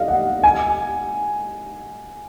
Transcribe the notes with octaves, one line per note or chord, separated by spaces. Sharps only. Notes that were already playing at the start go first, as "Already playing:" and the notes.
Already playing: D5 D#5 F5
F#5
G#5